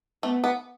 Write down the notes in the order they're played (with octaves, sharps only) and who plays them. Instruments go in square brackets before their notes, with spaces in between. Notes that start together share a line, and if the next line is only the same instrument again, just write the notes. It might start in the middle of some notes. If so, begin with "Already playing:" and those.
[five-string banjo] A3 [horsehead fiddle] B3
[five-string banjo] B3